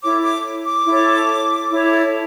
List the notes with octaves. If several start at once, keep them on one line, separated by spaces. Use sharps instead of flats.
E4 A4 C#5 D6
D6
D6
E4 A4 C#5
E4 A4 C#5